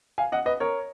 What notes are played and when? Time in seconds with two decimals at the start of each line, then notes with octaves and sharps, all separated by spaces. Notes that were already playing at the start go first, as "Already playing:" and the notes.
0.18 F5 G#5
0.32 D#5 F#5
0.46 B4 D#5
0.60 A#4 C#5